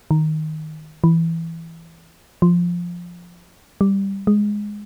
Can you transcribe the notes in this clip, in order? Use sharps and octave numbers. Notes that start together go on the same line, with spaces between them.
D#3
E3
F3
G3
G#3